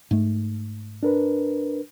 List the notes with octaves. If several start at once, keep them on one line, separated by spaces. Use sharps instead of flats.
G#2 A3
D4 A#4 B4